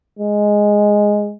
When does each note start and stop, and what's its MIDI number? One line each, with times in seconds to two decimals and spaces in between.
0.19 1.35 56